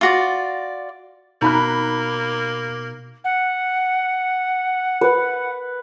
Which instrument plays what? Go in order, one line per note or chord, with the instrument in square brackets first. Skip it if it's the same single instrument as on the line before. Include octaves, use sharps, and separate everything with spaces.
[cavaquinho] F4 F#4 D5
[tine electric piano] B2 [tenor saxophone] A#3 [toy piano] D#4 [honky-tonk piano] A#5 B5 F#6
[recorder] F#5
[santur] B4